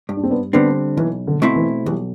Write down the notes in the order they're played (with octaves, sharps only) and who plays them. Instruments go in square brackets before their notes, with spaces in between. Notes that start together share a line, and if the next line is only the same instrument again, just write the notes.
[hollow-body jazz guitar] G2
[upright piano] D4
C4
B3 D4
[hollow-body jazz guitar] D3 G3 C4 [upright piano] B3 D4
[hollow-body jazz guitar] B1 [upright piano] E3
[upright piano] D3
[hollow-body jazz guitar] B2 A3 C4 E4
[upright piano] E3
[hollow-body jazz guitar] B1 [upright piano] E3 G3